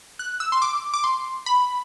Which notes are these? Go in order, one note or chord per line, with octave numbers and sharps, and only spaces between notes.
F#6
E6
C6
D6
D6
C6
B5